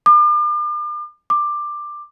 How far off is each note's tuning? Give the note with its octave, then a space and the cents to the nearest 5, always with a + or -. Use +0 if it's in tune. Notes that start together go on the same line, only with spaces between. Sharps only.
D6 +40
D6 +15